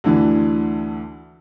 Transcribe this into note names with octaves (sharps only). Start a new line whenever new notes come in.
D2 D3 E3